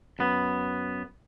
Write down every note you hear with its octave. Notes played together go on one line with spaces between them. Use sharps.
F#2 B3